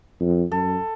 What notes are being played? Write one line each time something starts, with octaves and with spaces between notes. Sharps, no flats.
F2
F#2 A4